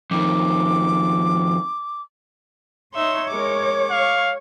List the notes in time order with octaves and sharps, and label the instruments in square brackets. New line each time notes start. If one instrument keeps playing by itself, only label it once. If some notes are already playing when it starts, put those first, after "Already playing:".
[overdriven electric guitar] F2 D#3 [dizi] D6
[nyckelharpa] D#4 E5 [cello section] C#5 [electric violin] C6
[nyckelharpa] G#3 A#4 [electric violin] D6
[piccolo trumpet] F5 [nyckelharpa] C#6